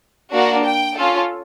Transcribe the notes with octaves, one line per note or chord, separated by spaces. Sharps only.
A#3 D4 F#4
G5
C#4 F4 A4